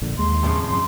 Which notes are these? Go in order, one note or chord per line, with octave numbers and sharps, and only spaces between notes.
A#1 A#2 D3
D#2 G#3 C6
F2 A2 C#3
F#2 C6